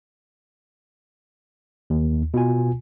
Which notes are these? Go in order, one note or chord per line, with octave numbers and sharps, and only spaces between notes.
D#2
B2 F4 G#5